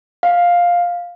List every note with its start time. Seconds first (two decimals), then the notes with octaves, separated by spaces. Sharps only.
0.23 F5